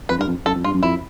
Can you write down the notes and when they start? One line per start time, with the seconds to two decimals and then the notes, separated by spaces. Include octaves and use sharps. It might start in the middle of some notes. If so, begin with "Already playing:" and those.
0.09 F2 B4
0.18 G2 A#4
0.27 F2
0.45 F#2 A4
0.55 F2
0.64 G2 F4
0.74 F#2
0.82 F2 E4